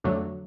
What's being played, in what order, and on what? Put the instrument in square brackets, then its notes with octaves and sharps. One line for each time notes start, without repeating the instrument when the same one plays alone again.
[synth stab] F2 D3 F#3 A3